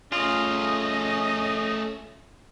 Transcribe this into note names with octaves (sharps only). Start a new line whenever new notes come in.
A3 C#4 F4 G#4 D#5